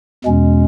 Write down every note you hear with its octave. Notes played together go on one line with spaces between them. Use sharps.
E2 B2 G#3 C#4